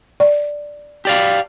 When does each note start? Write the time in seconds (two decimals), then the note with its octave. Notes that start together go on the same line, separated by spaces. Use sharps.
0.20 D5
1.05 G4 D5 F5